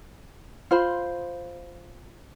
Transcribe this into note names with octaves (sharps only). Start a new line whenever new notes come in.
F4 C5 B5